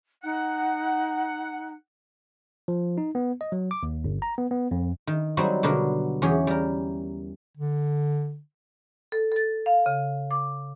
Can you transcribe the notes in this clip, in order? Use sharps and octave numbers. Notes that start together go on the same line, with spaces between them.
D#4 F#5
F3
D#4
B3
D#5
F#3
D6
D#2
G1
A#5
B3
B3
F2
D#3
F#3 G3 C4 D#4 F#4
B2 D3 D4 A#4
E2 C#4 G4 G#4
G3 A#4
D3
A4
A4 A6
F5
C#3
D6